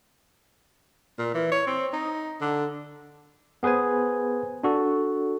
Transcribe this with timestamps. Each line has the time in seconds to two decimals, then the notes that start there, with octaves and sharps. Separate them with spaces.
1.19 A#2
1.34 E3
1.52 C#5
1.67 C4
1.93 D#4
2.41 D3
3.63 B3 G#4 B4 C5 G#5
4.64 D4 F#4 A4